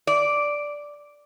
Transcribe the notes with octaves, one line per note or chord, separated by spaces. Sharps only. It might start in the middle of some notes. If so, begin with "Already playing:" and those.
D5